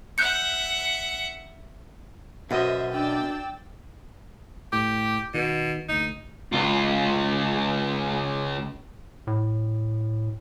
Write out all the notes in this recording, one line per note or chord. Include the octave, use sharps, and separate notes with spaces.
E5 F#5 F#6 G6 C#7
F#2 B2 C5 D#5 E5
D4 D5 G5 E6
A2 G4
B2 D#3
F#1 D2 D#4
C#2 F4
A2